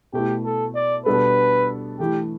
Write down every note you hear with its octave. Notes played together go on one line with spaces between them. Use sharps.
B2 A3 E4 G4
A4
D5
B2 G3 B3 D4 A4 B4
E3 A3 E4 G4